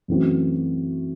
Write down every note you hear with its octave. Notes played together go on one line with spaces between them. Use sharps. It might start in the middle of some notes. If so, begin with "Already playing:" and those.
F#2 E3 A3 C4 F#4